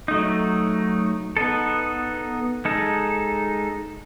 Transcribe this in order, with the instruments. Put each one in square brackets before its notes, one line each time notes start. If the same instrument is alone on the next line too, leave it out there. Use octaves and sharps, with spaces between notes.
[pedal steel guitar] F#3 A3 D#4
B3 D#4 A4
G#3 D#4 A4